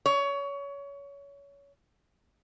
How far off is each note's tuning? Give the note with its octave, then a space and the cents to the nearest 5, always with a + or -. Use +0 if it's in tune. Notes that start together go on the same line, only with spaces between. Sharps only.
C#5 +25